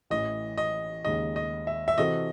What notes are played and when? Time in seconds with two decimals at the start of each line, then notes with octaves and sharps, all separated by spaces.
0.10 A1 A2 E3 D#5
0.58 D#5
1.04 D#2 C#3 G#3 D#4 D#5
1.36 D#5
1.67 E5
1.88 E5
1.98 C3 E3 C4 F#4 A4 D#5